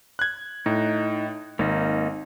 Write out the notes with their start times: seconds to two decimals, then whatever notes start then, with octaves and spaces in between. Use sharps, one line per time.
0.19 F#6 G#6
0.66 A2 D#4
1.59 G#1 A#3 D#4